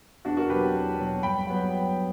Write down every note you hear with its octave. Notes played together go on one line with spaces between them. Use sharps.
E2 D4 F#4
F#4 A#4
B2 F#3 G4 B4
E2
B2 F#3
G2 G5 B5
F#3 B3